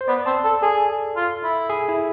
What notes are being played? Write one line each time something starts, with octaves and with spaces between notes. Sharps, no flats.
C5
B3 D5
C4 A5
A4
G#4 A4
F4
E4
G#4
E4